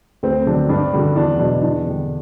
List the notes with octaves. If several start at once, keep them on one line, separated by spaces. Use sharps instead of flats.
D2 C4
D3 F#3 D4
G2 D4
D3 G3 F#4
E2 D4
B2 F#3 D4
E2 D4
D3 G3